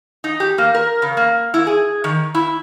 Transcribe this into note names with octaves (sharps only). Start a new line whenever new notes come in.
D#4
G4
A#3
A#4
C#3
A#3
E4
G#4
D#3
E4